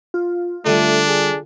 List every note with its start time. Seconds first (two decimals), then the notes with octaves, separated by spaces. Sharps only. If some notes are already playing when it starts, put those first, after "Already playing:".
0.14 F4
0.66 D3 G3 A3 D4
1.08 G#4